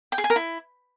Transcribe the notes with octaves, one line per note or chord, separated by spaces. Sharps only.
G5
G#4
G#5
A#4
E4